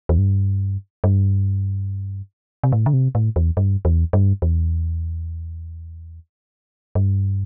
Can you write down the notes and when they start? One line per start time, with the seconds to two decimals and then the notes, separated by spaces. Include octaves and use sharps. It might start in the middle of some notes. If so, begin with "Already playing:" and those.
0.09 E2
0.18 G2
1.04 G2
2.63 C3
2.72 A2
2.86 D3
2.93 C3
3.15 A2
3.36 E2
3.57 G2
3.85 E2
4.13 G2
4.42 E2
6.95 G2